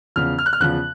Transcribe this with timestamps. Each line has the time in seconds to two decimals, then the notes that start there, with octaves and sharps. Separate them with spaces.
0.16 E2 C#3 F3 F6
0.39 F6
0.46 F#6
0.53 F6
0.60 E2 C#3 F3 F#6